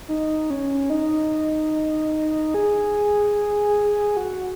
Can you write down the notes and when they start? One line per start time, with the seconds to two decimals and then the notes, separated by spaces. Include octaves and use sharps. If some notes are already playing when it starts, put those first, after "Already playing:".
0.08 D#4
0.50 C#4
0.90 D#4
2.54 G#4
4.17 F#4